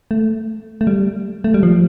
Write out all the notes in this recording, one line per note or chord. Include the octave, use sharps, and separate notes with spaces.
A3
A3
G3
A3
G3
F3